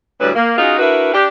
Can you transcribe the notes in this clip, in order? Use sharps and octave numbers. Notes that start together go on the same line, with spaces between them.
D2 A2 F#3 G3 B4
A#3
C#4 D#4 F4 F#4 G#4
D4 E4 F#4 A#4 B4
D4 G4